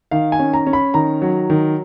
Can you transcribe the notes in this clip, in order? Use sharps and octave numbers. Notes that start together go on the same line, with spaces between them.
D#3 F5
G#5
C#4
A#5
C#4
B5
D#3 A#5
F#3
D#3